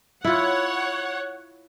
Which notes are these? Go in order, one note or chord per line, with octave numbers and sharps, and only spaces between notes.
E4 F4 C#5 F#5